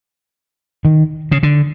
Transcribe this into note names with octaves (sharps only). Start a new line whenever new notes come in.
D#3
C#3
D3